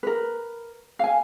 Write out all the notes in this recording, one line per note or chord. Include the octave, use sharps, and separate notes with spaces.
A#4 B4
F5 G#5